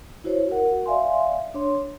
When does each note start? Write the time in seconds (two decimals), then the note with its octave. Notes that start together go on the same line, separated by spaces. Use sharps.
0.24 E4 F#4 C5 C#5
0.51 F#4 A#4 F#5
0.86 D5 E5 F5 G#5 C6
1.54 D4 C#5 C6